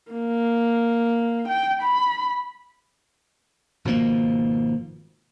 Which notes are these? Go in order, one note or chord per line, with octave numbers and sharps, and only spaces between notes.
A#3
G5
B5
G#1 B2 F3 A#3